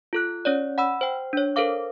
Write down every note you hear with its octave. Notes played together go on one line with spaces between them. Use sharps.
F4 A4 F#6
C#4 C#5 D5
F#5 B5 E6
C5 G5
D4 C#5
A4 A#4 C5 F5 D6